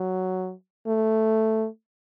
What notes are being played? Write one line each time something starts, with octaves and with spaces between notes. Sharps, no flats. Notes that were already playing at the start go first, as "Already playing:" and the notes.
Already playing: F#3
A3